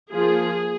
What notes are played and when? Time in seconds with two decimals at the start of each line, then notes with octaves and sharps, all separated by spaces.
0.12 F3 A#3 F4 G#4